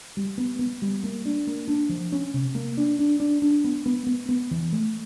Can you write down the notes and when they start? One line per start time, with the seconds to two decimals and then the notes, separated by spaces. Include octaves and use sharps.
0.17 G3
0.38 B3
0.59 B3
0.82 G3
1.04 A#3
1.25 D4
1.47 A#3
1.68 D4
1.89 F3
2.12 C#4
2.34 C3
2.55 A#3
2.77 D4
2.99 D4
3.20 D4
3.42 D4
3.64 B3
3.86 B3
4.07 B3
4.29 B3
4.51 E3
4.72 A3